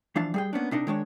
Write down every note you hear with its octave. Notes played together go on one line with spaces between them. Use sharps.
E3 F3 D4 F5 A5
G3 G#4 G5
A#3 B3 C#4 D4
C3 D4 D#4 A#4
D#3 G#3 D4 C#5